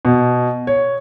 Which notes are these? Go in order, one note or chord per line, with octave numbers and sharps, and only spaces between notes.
B2
C#5